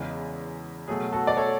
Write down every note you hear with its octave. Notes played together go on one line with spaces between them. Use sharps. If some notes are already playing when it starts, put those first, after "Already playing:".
Already playing: E2 C#3 G#3
B2 F#3 A3 G#4
F#4 A4
D5
A4 C#5